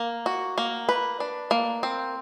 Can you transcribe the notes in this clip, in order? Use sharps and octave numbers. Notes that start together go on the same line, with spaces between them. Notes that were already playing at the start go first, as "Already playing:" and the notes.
Already playing: A#3
F#4
A#3
B4
D4
A#3
C4